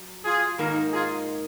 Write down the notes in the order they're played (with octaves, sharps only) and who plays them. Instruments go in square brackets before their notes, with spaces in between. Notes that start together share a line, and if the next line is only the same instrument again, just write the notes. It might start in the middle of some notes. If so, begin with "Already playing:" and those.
Already playing: [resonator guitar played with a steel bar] F#3
[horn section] F4 G#4
[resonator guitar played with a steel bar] G#2 D#3 A#3 D#4 A#4
[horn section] F4 G#4